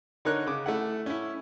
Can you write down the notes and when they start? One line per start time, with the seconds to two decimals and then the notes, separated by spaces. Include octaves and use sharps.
0.25 D3 D#4 A#4 C#5 F#6
0.46 C#3 D6
0.66 A3 E4 F#5
1.06 C#4 E4